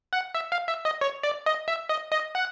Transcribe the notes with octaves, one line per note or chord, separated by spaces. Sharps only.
F#5
E5
F5
E5
D#5
C#5
D5
D#5
E5
D#5
D#5
F#5